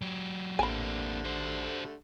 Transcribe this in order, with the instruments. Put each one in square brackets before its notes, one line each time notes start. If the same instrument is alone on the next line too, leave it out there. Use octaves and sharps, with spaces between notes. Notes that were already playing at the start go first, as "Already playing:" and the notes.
[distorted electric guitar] F#3 G4
[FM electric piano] A1 [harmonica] D3 G3 A3 [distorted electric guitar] A#3 C4 [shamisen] G#5 B5
[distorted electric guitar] F#4 C5